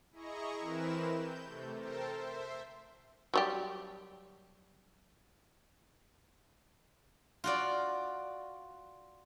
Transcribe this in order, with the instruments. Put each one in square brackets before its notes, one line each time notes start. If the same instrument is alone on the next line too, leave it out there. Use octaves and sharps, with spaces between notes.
[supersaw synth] E4 G#4 D#5 A#5 C#6
E3 C4 E4 A#4 B4 E7
G6
C3 A3
A4 A#4 C5 G5 A5
C5 E5
[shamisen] F#3 G3 G4
[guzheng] F4 F#4 D5